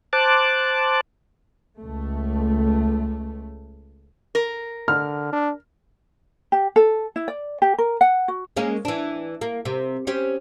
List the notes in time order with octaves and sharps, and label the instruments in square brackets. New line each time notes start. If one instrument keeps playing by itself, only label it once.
[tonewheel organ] C5 A5 D6 F#6
[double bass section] C#2 A3
[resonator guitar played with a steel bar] A#4
[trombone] D3 [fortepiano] F6
[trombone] D4
[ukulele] G4
A4
E4
D5
G4
A#4
F#5
F#4
[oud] G#3 A#3 C#4
E3 D4
A#3
C3
C4 C#4 G4